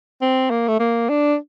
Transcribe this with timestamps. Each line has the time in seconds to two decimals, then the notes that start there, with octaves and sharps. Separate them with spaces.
0.21 C4
0.51 A#3
0.68 A3
0.80 A#3
1.09 D4